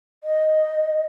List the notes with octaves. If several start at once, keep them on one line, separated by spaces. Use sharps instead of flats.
D#5